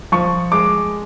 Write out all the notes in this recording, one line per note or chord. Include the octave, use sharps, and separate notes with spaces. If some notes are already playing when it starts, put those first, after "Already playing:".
F3 C#6
G#3 D6